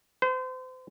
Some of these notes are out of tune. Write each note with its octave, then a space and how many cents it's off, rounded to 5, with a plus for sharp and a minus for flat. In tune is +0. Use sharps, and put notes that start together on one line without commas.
C5 -35